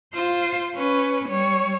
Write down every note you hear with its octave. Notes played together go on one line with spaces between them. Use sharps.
F4 C5
C#4 B4
G3 C#5